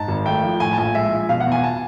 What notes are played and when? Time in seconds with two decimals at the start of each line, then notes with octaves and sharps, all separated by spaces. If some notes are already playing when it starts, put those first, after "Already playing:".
Already playing: G#2 A5
0.08 G#1
0.25 A3 G5
0.43 F3
0.60 A2 G#5
0.73 A5
0.78 A#1 G#5
0.95 G#3 E5
1.12 F3
1.29 B2 F5
1.40 F#5
1.47 E2
1.52 G#5
1.63 A5